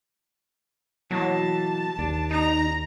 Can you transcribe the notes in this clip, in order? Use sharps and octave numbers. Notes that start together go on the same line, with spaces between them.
B2 E3 F#3 A#3 A5
D#2 D4
D#4 A#5